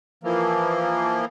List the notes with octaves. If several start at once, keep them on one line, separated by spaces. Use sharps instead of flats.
E3 F3 A#3